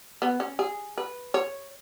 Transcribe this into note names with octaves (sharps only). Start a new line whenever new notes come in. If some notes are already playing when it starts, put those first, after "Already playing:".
B3
C#4
G#4
B4
C#5